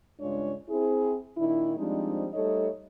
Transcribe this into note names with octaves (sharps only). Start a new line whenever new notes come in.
G2 C#3 G#3 D4 F4 C#5
C4 E4 G#4
A#2 D#3 D4 E4
F3 G3 G#3 C4 D4 D#4
G3 A3 D#4 A4 C#5 D#5